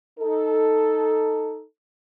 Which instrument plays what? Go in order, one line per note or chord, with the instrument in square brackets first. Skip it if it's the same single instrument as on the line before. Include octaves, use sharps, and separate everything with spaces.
[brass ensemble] D#4 A4